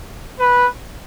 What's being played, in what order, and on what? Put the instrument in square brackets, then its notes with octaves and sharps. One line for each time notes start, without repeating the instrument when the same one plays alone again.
[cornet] B4